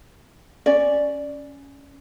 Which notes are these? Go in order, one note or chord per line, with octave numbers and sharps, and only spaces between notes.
C#4 D5